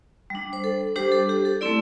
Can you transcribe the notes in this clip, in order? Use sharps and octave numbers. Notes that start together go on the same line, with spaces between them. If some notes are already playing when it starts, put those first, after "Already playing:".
G3 D4
C5
A4
G3 D4 G4 C5
A4
G4
A4
A3 C4 E4 A4 D5